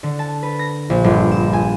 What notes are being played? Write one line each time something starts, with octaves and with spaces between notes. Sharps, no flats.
D3
A5
B4
A#6
A#1
G1
E7
G#5